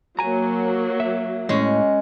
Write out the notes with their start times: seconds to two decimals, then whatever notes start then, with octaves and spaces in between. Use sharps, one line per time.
0.19 F#3 A#3 G#5 A#5
1.00 E5
1.49 A2 G#3 C#4